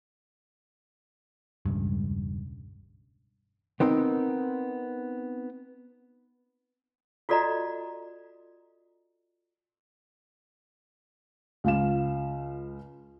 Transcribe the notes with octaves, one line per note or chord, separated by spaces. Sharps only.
E1 C#2 G2
B3 C4 D#4 A#4
F4 F#4 A4 D5 D#5 A#5
C#2 F4 F5 E7